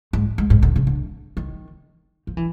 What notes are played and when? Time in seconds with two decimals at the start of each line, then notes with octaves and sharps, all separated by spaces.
0.13 G#2
0.38 G#2
0.50 G#2
0.62 D3
0.76 C#3
0.87 D3
1.37 D#3
2.27 F3
2.37 E3